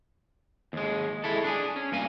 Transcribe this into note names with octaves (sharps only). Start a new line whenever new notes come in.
D#2 G#3
G#3 E4 A4
D4 G#4
C#4
G2 A#3 G#5